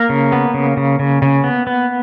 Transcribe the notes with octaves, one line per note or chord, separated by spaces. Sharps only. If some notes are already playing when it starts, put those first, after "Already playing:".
Already playing: A#3 A#4
C#3
B3
C#3
C#3
C#3
C#3
B3
B3